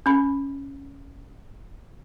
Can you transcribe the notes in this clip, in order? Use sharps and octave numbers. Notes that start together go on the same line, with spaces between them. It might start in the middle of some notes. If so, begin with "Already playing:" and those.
C#4 B5